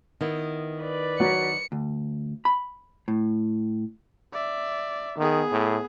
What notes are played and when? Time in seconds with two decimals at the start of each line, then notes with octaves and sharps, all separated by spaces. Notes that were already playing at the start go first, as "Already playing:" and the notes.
0.21 D#3 B3 E4
0.81 B4 D5
1.20 F#3 C#7
1.72 D2
2.45 B5
3.08 A2
4.33 D5 E5
5.18 D#3 B3 G#4
5.52 A2